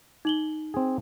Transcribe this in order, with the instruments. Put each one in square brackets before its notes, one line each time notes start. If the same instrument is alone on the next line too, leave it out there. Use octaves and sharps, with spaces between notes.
[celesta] D#4 F#7 G7
[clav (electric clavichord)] C4 G#4